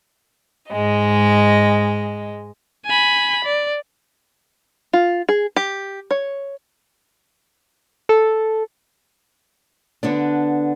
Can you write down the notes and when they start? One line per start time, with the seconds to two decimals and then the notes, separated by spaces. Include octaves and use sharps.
0.71 G#2 G#3 D#5
2.86 G#5 B5
3.45 D5
4.93 F4
5.29 G#4
5.56 G4
6.11 C#5
8.09 A4
10.03 D3 B3 D4